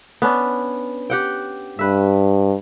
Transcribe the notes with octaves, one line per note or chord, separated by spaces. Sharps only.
B3 C#4 D4
G4 F#5 G5
G2 B4 E5